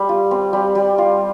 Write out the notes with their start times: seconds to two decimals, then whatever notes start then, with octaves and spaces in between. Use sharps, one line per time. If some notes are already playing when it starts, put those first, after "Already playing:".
Already playing: G3
0.09 F4
0.31 C4
0.53 G3
0.75 G3
0.98 F4